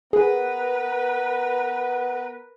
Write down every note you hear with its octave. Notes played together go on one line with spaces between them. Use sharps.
B3 G#4 A#4 B4